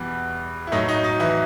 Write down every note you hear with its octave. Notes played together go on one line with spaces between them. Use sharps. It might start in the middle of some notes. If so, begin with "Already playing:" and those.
Already playing: E2 B2 E3 G3
E4
A2 F#3 A3 D#4
D#4
D#4
E3 E4